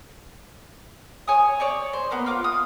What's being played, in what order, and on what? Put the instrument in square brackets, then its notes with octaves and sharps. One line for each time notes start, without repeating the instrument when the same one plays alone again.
[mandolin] C#5 G#5 D#6
C#5 D5 C#6
C5
A#3 B3
F4 D6
D#6